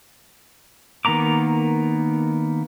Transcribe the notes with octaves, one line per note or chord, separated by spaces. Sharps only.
D#3 A#3 B3 A#5 D6